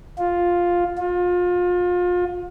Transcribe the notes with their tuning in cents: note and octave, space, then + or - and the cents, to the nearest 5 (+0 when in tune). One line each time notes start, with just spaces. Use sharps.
F4 +5
F4 +30